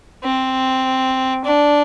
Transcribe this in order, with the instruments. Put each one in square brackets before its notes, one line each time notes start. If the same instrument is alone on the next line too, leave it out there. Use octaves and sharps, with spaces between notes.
[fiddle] C4
D4